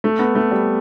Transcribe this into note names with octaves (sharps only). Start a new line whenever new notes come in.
A3
B3
A3
G3